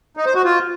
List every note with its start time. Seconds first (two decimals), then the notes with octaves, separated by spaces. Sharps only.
0.17 D#4
0.26 C5
0.35 F#4
0.44 F4